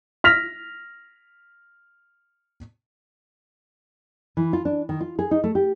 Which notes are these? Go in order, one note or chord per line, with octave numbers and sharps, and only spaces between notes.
F6 A#6 B6 F7
E3
F4
D4
D#3
F4
G#4
D#4
A3
G4